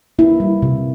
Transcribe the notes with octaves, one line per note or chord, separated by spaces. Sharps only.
A#3 E4
G3
C3